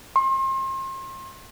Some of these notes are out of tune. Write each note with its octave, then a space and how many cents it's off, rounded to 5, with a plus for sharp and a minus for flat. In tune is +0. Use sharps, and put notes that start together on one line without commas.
C6 +35